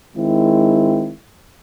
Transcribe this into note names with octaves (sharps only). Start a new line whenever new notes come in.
D#3 G#3 C4 E4